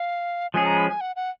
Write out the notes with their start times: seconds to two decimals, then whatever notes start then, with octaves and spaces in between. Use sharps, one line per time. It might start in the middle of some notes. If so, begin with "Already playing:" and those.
Already playing: F5
0.54 F3 G#3 C#4 G#4 G#5
0.66 A#5
0.77 B5
0.88 G#5
1.01 F#5
1.16 F#5